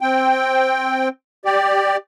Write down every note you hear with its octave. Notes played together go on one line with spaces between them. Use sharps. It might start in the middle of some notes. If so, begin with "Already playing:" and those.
C4 G5
G4 D5